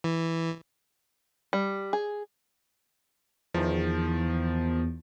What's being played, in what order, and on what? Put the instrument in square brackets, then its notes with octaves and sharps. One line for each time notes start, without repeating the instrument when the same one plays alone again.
[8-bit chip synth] E3
[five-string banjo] G3
G#4
[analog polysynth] E2 [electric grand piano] D#3 F3